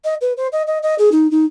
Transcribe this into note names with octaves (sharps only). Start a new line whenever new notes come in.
D#5
B4
C5
D#5
D#5
D#5
G#4
D#4
D#4